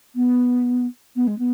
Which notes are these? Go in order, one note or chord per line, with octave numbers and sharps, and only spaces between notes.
B3
B3
G#3
B3